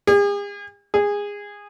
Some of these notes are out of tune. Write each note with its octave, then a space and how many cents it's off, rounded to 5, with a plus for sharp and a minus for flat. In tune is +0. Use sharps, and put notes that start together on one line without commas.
G#4 -45
G#4 -20